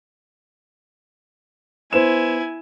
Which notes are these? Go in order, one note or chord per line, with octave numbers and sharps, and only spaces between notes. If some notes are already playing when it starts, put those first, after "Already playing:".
B3 E4 C5 G#5 E7